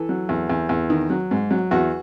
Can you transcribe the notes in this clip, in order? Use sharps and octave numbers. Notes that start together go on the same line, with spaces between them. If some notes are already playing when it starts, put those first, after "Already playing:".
Already playing: E3 A4
F#3
E2
E2
E2
D#3
F#3
G#2
F#3
E2 F#4